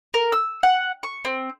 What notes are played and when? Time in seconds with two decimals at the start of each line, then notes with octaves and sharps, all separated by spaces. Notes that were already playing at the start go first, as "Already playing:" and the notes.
0.14 A#4
0.32 E6
0.63 F#5
1.03 C#6
1.25 C4